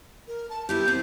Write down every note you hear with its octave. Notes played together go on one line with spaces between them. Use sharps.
A#4
A5
B3 E4 G4 G6
C4